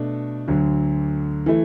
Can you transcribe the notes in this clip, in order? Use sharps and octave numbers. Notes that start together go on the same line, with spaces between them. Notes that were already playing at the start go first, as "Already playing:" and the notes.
Already playing: B2 A3 D4
D2 D3 F#3
E3 A3 E4